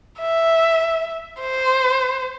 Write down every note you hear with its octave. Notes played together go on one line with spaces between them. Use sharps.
E5
C5